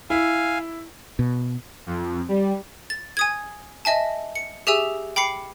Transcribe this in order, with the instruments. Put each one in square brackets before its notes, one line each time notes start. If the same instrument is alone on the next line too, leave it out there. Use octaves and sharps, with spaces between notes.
[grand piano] E4 [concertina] F5 G#5
[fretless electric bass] B2
[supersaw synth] F2
G3
[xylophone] A6
G#5 D#6 G#6
D#5 E5 G#5 A5
C#7
G4 G#4 E5 G#5 E6
G5 B5 D6 C7 C#7